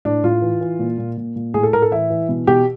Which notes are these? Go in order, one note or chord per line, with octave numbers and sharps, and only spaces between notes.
A2 D4
A2 F4
E3
E3
A#2
A#2
A#2
A#2
A2 G#4
A4
A2 A#4
A4
E3 E4
E3
B2
B2 G4